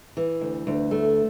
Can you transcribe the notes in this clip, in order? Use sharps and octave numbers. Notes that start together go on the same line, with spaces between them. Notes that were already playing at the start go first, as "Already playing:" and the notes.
E3
D2
D2
A3